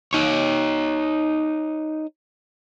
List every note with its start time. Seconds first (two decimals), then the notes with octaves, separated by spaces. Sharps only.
0.13 D#4 C#5